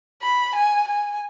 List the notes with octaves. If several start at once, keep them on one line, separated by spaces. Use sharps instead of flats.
B5
G#5
G#5